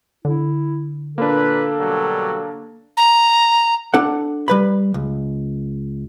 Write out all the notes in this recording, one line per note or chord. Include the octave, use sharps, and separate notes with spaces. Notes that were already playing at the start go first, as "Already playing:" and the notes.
D3 E4
A#2 A#3 D4 A4 B4
B2 F#3 G3
A#5
D4 A4 F#5
G3 B4 B5
C#2